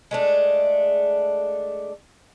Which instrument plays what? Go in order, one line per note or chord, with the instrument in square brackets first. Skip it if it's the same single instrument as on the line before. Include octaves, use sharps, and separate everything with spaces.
[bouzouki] G#3 A3 D4